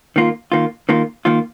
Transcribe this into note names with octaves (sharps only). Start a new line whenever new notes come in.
D#3 A#3 F4
D#3 A#3 F4
D#3 A#3 F4
D#3 A#3 F4